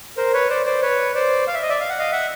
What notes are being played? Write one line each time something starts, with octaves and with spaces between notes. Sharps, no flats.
A#4 C5
B4 C#5
C5 D5
C5 D5
B4 C#5
C5 D5
F5
E5
D#5
D5 E5
F5
F#5
D#5 F5
E5 F#5